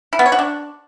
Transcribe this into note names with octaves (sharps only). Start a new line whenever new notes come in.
E4
B3
C#5
F#4
D4